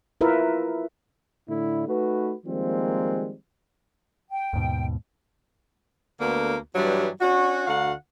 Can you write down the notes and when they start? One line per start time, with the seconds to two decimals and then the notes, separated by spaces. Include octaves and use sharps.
0.21 E4 F4 A#4 B4 E5
1.49 A2 D3 E4
1.87 A3 D#4 F#4 B4
2.46 D#3 F3 G3 G#3 A#3 C4
4.31 G5
4.53 D#2 G#2 B2
6.20 D2 D3 A#3 B3
6.75 G2 E3 F#3 G3
7.21 C#4 D4 F#4
7.67 D2 D3 F#4 F5 F#5